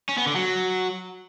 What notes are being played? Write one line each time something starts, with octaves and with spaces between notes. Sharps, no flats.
C#4
B3
D3
F#3